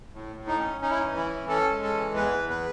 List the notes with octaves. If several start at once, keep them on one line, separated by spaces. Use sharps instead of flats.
A2
A2
D#4
C#4
C#4 D#4
E4
E3 D#4
E4
C#4
C#4 A4
G#3
A4
E3
E2 B4
E2
B4